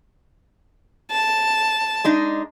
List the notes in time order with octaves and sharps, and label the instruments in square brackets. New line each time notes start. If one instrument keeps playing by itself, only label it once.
[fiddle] A5
[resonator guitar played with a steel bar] G#3 D4 D#4